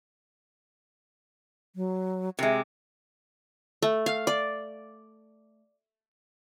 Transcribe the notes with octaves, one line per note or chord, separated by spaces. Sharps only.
F#3
C3 G#3 E5
A3
F5
D5